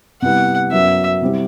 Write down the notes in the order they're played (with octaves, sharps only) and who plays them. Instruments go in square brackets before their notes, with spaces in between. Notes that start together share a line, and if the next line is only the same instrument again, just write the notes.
[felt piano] C3 G3 B3 E4 [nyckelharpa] F#5
[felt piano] F#2 F#3 B3 [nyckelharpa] E5
[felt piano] C3 G3 C4 E4